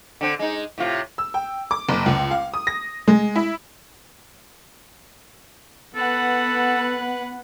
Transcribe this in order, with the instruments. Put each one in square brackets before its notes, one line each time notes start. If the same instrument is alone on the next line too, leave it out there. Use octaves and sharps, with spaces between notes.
[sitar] D3 C4
G#3 D#4
A2 C3 F4
[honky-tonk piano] E6
G5
D6
F#1
C#2
F5
D#6
A#6
G#3
E4
[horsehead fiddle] B3 [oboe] A4 [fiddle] B4 F#5